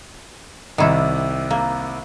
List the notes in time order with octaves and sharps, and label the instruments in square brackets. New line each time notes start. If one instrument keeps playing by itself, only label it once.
[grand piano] C2 C3 [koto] D#3 E4
[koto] A#3